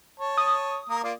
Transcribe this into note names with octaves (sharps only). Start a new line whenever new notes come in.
C#5 A5
D#6
A#3 A#4 D#6
A#3 F4 D5